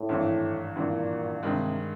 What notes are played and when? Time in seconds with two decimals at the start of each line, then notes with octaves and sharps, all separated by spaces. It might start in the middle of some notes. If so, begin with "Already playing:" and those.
Already playing: A2
0.09 G#1 G2 E3
0.75 G#1 G2 A#2 E3
1.43 G2 C3 D#3 G#3